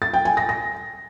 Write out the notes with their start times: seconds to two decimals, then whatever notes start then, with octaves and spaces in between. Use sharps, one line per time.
0.02 A6
0.13 G5
0.25 G#5
0.37 A#6
0.49 A#6